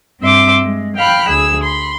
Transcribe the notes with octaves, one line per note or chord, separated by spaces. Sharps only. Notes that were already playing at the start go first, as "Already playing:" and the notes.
G2 C4 E5 C6 D6
G#3
F5 G5 B5 F6 F#6
D2 G#4 E6
B5 C6